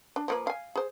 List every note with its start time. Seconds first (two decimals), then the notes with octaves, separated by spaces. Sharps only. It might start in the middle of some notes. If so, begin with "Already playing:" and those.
0.16 D4
0.28 F3 A#3 B4
0.47 F5 G#5
0.75 G#4 C5